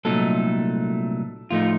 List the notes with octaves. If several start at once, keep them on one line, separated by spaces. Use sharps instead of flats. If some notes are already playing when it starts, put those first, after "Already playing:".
C2 A#2 F#3 A3 D#4 A4
A2 F3 A3 D#4 F4